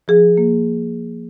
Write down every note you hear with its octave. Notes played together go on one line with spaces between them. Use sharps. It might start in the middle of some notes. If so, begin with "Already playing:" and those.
F3 G#4
A#3